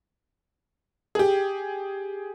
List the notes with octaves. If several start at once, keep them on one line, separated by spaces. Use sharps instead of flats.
G4 G#4